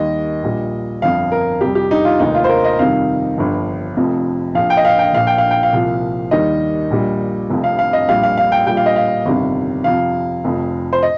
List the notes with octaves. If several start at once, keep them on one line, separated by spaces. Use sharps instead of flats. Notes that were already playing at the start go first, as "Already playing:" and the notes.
Already playing: D#2 D#3 G3 D#5
A#1 A#2 G3
G1 F2 F3 F5
A#4
F2 C3 G3 G4
G4
D#4
F4
F1 D#2 D#3 D#4
F4
C5
A#4
D#5
F2 C3 D#3 G3 F5
G1 G2 F3
F1 F2 C3 F3
A#1 A#2 F3 F5
G5
D#5
F5
G5
A#1 A#2 F3 F5
G5
F5
G5
F5
C2 A#2 F3
D#2 D#3 G3 D#5
A#1 A#2 G3
F1 F2 C3 F3
F5
F5
D#5
A#1 A#2 G3 F5
F5
F5
G5
A#1 A#2 G3 G5
F5
D#5
F5
G1 F2 C3 D#3 G3
F2 C3 F3 F5
F1 F2 F3
C5
D#5